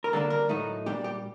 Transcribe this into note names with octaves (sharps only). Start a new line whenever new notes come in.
A#4
D3 G3 A#3 D4 A4
A#4
A2 F#3 A3 D#4
A#2 G3 D4 G4
G4